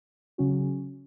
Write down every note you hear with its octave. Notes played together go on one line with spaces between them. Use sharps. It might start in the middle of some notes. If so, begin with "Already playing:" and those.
C#3 F#3 C#4 F#4